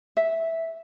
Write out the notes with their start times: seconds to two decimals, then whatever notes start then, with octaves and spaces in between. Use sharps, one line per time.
0.17 E5